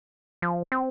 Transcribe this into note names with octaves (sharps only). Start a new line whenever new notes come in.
F3
C4